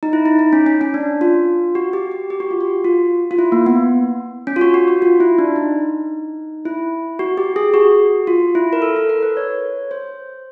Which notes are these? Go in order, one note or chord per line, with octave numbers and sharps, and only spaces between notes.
D#4
E4
D#4
D#4
C#4
C#4
C#4
D4
F4
F#4
G4
G4
G4
F#4
F4
F#4
F4
F4
E4
A#3
B3
C#4
F4
F#4
F#4
F#4
F4
E4
D4
D#4
E4
F#4
G4
G#4
F#4
F4
E4
A#4
A4
A4
A#4
B4
C#5
C5